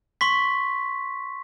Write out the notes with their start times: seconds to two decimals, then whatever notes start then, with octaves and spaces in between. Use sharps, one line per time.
0.21 C6 C#6 B6